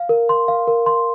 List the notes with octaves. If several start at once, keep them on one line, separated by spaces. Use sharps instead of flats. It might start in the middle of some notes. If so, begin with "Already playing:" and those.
Already playing: F5
A#4
C6
F5
A#4
C6